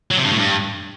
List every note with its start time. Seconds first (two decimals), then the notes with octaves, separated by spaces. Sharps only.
0.11 F#3
0.18 C3
0.24 G2
0.31 A2
0.38 G2